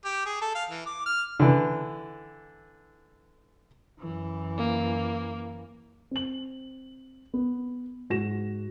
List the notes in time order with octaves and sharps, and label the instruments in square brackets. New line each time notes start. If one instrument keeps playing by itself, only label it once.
[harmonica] G4
G#4
A4
F5
E3
D6
F6
[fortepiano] D3 E3
[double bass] F#2 E3
[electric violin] A#3
[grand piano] C4 F#7
B3
G#2 F#4 A#6 E7